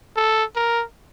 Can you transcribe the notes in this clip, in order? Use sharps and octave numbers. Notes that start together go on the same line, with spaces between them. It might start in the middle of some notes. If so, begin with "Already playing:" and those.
A4
A#4